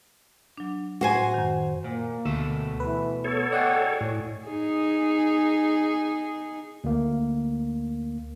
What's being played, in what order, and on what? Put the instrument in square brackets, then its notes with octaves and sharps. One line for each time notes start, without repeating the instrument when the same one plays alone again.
[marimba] F#3 D4
[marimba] A2 G5 [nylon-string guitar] F#4 C5 G#5
[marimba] F#2 D#3
[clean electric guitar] A#2 [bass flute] A#3
[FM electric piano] D2 [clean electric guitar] B2 A3 E5
[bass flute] E3 [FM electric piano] B4
[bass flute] B3 [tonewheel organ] A4 C#5
[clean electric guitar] F#4 G#4 [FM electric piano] D5 F#5 G5 [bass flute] D#5
[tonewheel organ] A2 [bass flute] C#5
[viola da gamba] D#4 G#4
[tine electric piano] D2 A#3